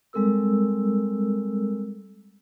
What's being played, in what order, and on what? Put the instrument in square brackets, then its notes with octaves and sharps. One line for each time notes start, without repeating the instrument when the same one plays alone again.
[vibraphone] G3 G#3 C4 A4 A#4 E6